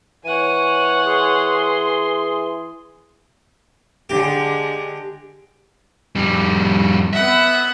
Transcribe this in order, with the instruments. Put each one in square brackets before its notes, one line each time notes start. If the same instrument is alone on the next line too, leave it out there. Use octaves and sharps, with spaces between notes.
[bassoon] E3 [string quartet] C#5 F#5 G#5 [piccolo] D#7
[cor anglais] G#4 [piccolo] C6
[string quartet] D3 G#3 [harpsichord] G4
[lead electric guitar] F2 G3
[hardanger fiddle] B3 F#5 [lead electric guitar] E5